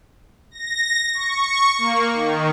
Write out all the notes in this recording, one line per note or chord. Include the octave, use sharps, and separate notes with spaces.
A#6
C#6
A#3
D#3